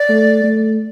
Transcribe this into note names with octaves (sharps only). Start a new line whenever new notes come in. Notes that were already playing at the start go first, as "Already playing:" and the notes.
Already playing: D5
A3
A3